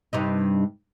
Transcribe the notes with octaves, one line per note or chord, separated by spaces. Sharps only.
G2 C3 D#4